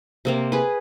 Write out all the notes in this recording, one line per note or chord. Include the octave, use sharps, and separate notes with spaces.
C3 A#3 C4
G#4 B4